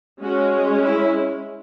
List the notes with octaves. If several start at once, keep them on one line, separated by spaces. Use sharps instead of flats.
G#3 C#4 F#4
E4